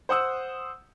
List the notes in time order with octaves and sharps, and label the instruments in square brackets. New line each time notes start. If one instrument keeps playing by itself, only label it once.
[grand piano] C5 F#5 D#6 E6